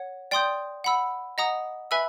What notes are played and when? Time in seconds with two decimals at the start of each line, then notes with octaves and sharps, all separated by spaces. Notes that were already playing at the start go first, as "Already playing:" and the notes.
Already playing: C#5 F#5
0.31 D5 G5 C6 D#6 G6
0.84 F#5 B5 E6
1.38 D#5 F#5 A#5 D#6
1.91 B4 E5 G#5 B5 E6